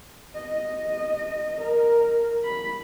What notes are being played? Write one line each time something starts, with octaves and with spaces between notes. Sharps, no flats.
D#5
A#4
B5